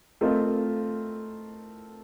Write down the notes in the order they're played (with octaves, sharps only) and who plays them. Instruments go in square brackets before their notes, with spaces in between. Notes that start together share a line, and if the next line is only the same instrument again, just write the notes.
[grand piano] A3 C4 F4 A#4 D#5